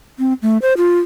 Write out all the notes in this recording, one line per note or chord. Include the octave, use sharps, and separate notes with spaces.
C4
A3
C5
F4